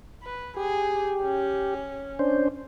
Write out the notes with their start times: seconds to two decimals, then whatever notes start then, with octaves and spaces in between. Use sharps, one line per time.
0.23 B4
0.57 G4 G#4
1.24 C#4
2.19 C#4 D4 C5